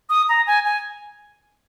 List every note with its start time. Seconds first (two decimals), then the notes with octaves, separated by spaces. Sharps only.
0.10 D#6
0.29 A#5
0.47 G#5
0.65 G#5